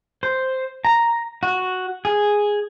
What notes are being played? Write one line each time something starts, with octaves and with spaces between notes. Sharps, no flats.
C5
A#5
F#4
G#4